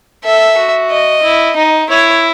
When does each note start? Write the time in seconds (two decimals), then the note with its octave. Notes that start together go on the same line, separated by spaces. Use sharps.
0.24 A4 E5
0.58 F#4
0.91 D#5
1.23 E4
1.56 D#4
1.89 E4 C#5